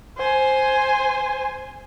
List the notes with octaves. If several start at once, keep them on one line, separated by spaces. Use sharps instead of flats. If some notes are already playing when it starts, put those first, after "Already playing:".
C5 G#5